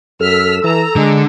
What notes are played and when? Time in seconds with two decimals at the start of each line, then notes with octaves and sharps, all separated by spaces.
0.20 F#2 A4 E6 F6 B6
0.64 E3 A#5
0.96 D3 G#3